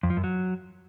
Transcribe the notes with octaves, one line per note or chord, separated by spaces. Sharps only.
F2
F3
F#2
F#3